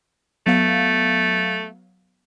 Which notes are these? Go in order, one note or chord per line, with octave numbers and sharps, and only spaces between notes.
F#3 A3 B3 F5